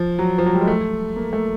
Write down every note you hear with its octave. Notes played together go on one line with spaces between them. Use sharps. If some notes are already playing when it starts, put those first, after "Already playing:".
Already playing: F3
F#3
F3
F#3
G3
G#3
A3
A#3
A3